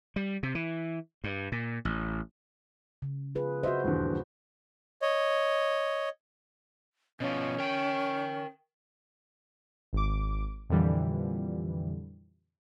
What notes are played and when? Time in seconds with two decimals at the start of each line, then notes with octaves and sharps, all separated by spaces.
0.16 G3
0.43 C3
0.55 E3
1.24 G2
1.52 A#2
1.85 A1
3.02 C#3
3.35 F4 G#4 B4
3.63 F#4 C5 D#5 E5
3.84 D#1 E2 G2
5.02 C#5 D#5
7.20 B2 F3 C#4
7.59 A#4 G5
9.93 G#1 D6
10.69 F2 A#2 D3 E3 G3